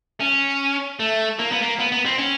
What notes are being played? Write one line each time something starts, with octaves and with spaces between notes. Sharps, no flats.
C#4
A3
A#3
B3
A#3
B3
B3
C4
C#4